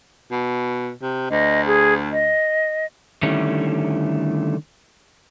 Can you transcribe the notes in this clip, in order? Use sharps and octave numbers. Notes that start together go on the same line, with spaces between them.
B2
C3
D2 D#5
G#4
D#5
D3 D#3 G3 A3 C#4 E4